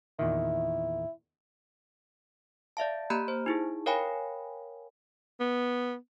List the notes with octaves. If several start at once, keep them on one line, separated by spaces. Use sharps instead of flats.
E2 A#2 D#3 E4
D5 E5 F5 A5
A#3 G4 A#5 B5 F#6 G6
C5
D#4 E4 G#4
A#4 C#5 F5 G5 G#5 B5
B3